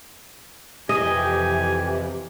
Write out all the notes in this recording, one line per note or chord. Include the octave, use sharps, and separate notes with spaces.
F2 C3 E3 G4 D#5 G#5